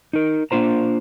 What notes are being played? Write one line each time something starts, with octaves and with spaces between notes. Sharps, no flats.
D#4 A#4
A#3 D4 F4 C5 A#5